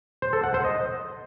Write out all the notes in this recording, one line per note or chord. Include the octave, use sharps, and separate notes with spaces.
C5
A4
F#5
C5
D#5